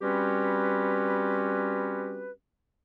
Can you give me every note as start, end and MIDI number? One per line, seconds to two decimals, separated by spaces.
0.01 2.31 55
0.01 2.31 60
0.01 2.31 61
0.01 2.31 66
0.01 2.31 67
0.01 2.31 71